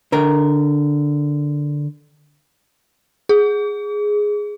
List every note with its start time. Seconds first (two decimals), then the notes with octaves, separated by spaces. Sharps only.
0.12 D3 A#4
3.29 G#4